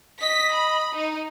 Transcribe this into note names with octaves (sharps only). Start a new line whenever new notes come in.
D#5 B6
B5
D#4